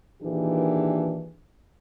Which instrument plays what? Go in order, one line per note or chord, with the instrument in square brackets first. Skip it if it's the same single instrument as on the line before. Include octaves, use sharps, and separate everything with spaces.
[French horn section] A#2 D#3 E3 D4 G4 G#4